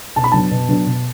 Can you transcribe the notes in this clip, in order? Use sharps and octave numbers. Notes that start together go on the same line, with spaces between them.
B2 A5
B5
F#3 B3 D4 A5
B2
F#3 B3 D4
B2